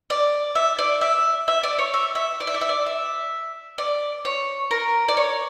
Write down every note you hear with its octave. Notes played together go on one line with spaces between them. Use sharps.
D5
E5
D5
E5
E5
D5
C#5
E5
E5
D5
E5
D5
E5
D5
E5
D5
C#5
A#4
D5
C#5